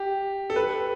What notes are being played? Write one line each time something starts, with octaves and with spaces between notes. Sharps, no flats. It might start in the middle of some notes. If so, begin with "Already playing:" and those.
Already playing: G4
A4
B4